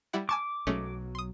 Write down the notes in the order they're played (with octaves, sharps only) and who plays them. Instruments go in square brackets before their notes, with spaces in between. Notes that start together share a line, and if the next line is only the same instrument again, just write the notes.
[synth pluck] G3 E4 F#5
[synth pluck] G#5 A5 C#6 [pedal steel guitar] D6
[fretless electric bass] B1 F#3 [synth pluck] G#3 A3 C#4
[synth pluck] C6 D#6